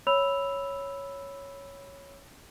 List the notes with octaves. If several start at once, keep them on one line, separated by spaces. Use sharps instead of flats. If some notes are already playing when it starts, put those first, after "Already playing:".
C#5 B5 E6 F7